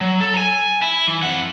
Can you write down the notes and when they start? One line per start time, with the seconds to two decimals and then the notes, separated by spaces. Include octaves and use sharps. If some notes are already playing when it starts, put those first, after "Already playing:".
0.01 F#3
0.20 A4
0.34 G#5 A#5
0.82 E4
1.08 E3
1.23 F2 F#5